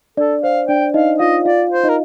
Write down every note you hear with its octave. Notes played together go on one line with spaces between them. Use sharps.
D4 A4 D5
C5 F5
D4 D5 G5
D#4 D#5 F5
F4 D#5 F5
F4 D5 F5
C5
D#4 D#5
A#4